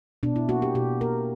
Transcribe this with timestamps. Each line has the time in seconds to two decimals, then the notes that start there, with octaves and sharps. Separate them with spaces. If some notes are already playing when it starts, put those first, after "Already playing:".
0.23 B2 D4
0.36 E4
0.49 A#3 F#4
0.62 G4
0.75 B2 G4
1.01 A#3 A#4